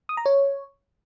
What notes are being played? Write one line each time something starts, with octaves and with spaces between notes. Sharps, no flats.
D#6
A#5
C#5